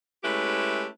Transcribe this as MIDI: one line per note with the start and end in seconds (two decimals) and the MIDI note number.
0.24 0.87 56
0.24 0.87 57
0.24 0.87 61
0.24 0.87 64
0.24 0.87 67
0.24 0.87 71